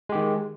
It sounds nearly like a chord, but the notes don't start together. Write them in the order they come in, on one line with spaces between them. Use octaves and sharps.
G#3 G4 D#3